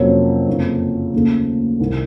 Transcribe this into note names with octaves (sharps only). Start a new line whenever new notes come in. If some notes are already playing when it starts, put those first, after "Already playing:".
Already playing: F2 C3 F#3 A#3 C#4
F#1 F2 C#3
D#2 C#3 A3 D#4
C2 C3 D#3